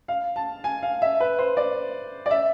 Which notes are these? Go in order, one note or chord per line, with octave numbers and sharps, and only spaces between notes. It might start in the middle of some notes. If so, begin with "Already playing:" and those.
F5
A5
G#5
F5
E5
B4
C5
D5
D5
E5